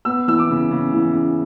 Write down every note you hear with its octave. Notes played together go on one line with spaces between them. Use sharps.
B3 E6
E3 E6
D6
C#3
C#3
E3
C#3